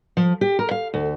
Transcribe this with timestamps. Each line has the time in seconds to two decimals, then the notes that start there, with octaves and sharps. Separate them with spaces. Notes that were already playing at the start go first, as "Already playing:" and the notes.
0.17 F3
0.41 G4
0.59 A#4
0.71 F5
0.94 D2